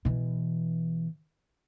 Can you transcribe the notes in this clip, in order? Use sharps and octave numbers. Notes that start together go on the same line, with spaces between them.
B2 E3